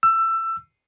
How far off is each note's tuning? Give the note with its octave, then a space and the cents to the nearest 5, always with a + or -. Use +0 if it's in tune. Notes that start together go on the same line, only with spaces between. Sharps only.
E6 +20